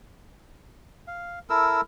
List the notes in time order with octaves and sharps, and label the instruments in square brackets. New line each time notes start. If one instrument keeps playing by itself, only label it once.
[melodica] F5
E4 A4 A#4 E6